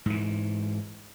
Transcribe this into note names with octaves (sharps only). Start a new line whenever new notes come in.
G#2 E3